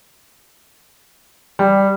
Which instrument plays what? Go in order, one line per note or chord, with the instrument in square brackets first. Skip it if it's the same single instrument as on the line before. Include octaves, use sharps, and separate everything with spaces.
[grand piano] G3